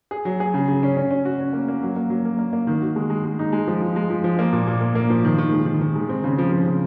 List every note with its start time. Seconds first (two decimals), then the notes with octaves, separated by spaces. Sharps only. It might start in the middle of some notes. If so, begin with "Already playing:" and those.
0.11 G#4
0.25 F#3
0.40 G#4
0.54 C#3
0.68 C#3
0.83 C#4
0.97 C#4
1.11 C#4
1.25 F#4
1.40 C#4
1.53 A#3
1.68 A#3
1.83 F#3
1.96 A#3
2.10 F#3
2.25 A#3
2.39 A#3
2.53 A#3
2.67 D#3
2.82 F#4
2.96 G#3
3.10 G#3
3.24 G#3
3.39 D#4
3.52 G#3
3.67 F3
3.82 F3
3.96 G#3
4.10 F3
4.24 F3
4.39 A#3
4.53 A#2
4.67 A#2
4.81 A#3
4.95 A#3
5.10 F3
5.25 D#3
5.38 D#3
5.53 G#3
5.66 D#3
5.81 D#3
5.95 G#3
6.09 C4
6.24 C#3
6.38 F3
6.52 F3
6.66 C#3